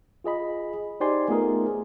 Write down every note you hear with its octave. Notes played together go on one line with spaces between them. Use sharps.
F4 G#4 D#5 B5
D#4 G4 C5 D5 G#5 C6
A3 B3 D#4 F4 G#4 A#4